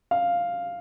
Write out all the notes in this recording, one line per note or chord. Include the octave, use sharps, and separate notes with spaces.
F5